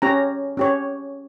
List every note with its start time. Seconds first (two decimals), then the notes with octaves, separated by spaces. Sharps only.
0.02 C#4 G4 C#5 A#5
0.57 C#4 G4 C#5